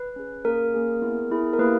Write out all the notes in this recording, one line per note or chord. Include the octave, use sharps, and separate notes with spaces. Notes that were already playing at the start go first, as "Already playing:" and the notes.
Already playing: B4
C#4 G#4
A#3 C#4 G#4 A#4
A#3 C#4 G#4
B3 E4 G#4
B3 E4 G#4
A#4
A#3 E4 G4 B4